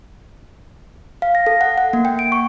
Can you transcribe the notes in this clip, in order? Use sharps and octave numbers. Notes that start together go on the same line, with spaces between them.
F5
A#6
A4
F#5
F#5
A#3
G5
D7
C#6